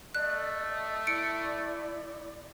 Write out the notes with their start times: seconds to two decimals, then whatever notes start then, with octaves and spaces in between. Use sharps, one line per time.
0.15 A3 D5 D#5 F#6
1.07 E4 D5 C#7 D7